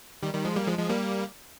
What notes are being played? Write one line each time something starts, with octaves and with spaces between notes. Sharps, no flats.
D#3 G3
D#3 G3
F3 G#3
G3 A#3
F3 G#3
F3 G#3
G3 A#3